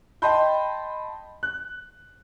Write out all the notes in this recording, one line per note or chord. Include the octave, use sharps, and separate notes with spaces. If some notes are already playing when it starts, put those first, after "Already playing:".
D#5 G5 A5 B5 C6 G6
F#6